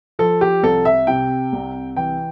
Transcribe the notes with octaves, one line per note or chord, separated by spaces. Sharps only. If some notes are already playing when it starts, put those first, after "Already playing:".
F3 A4
G4
C2 A4
E5
C3 G5
C2
E3 G5